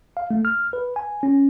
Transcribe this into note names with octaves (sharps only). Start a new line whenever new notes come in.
F5
A3
F6
B4
G#5
C#4